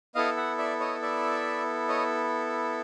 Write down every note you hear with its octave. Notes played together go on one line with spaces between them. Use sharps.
B3 E4 A4 D#5 F5
E5 F#5
D5 E5
C#5 D#5
D5 E5
C#5 D#5